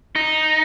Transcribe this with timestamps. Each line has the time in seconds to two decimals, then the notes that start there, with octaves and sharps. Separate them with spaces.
0.16 D#4